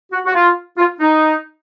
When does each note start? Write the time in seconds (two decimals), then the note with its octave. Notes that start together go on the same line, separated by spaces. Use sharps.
0.12 F#4
0.25 F#4
0.33 F4
0.77 F4
1.00 D#4